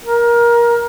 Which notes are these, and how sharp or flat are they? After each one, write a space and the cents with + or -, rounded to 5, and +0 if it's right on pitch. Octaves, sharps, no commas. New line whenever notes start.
A#4 +20